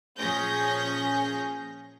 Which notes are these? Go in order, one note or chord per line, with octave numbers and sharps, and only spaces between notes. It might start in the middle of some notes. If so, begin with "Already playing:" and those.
A#2 F3 C#4 G#4 G6 A#6